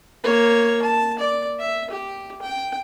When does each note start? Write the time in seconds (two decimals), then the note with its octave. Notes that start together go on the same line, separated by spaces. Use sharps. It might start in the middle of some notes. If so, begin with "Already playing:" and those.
0.24 A#3 C#5
0.82 A5
1.19 D5
1.59 E5
1.90 G4
2.42 G5